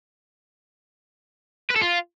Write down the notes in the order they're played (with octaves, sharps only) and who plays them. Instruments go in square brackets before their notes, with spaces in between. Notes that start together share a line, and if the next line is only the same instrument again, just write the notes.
[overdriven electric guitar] B4
A4
F4